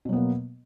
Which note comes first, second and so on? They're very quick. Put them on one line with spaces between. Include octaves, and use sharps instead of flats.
B2 F#3 B3 A#3